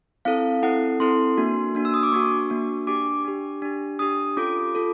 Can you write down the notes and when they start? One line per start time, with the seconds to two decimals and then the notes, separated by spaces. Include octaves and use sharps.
0.25 C4 E4 A4 F5
0.63 C4 E4 A4 F#5
1.00 C4 E4 A4 C6
1.37 A#3 D4 F#4
1.75 A#3 D4 F#4
1.85 E6
1.94 D#6
2.03 D6
2.12 A#3 D4 F#4 C#6
2.50 A#3 D4 F#4
2.87 D4 G4 D6
3.24 D4 G4
3.62 D4 G4
3.99 D4 G4 D#6
4.37 C#4 F4 A4 D6
4.75 F4 A4